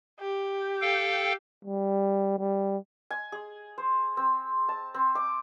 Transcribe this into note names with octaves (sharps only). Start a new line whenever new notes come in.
G4
A4 F5 G5
G3
G3
G#5
G#4
C5
C4
A5
C4
D6